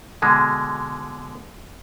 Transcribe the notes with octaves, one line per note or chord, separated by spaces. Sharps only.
B2 D3 G#3